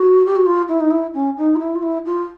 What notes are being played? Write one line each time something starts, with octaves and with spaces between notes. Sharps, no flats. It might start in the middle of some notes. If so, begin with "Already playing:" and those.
Already playing: F#4
G4
F#4
F4
E4
D#4
E4
C#4
D#4
F4
E4
F4
E4
F4